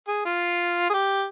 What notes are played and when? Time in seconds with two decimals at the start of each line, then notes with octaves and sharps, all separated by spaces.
0.08 G#4
0.25 F4
0.90 G#4
0.94 G4